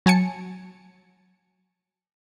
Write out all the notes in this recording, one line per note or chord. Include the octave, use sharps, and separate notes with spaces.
F#3 G#5 A5 C#7